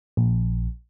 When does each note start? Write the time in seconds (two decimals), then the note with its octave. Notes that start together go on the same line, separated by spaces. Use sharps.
0.17 A#1